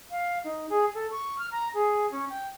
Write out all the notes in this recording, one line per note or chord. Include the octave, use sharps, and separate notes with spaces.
F5
D#4
G#4
A4
C#6
F6
A#5
G#4
C#4
G5